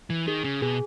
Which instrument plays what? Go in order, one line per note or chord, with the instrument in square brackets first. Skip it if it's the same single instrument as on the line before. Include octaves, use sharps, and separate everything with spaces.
[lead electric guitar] E3
[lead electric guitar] D#3 [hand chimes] G#4
[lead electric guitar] C#3
[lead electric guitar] B2 [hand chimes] G#4